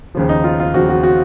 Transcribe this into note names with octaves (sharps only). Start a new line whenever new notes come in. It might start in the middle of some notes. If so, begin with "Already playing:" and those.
D#2 C#3 F3
D#4
F4
F4
D#2 C#3 F3 F#4
F#4
F#4